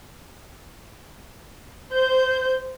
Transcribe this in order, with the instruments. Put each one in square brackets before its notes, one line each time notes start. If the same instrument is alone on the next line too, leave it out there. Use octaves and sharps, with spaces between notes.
[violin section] C5 G6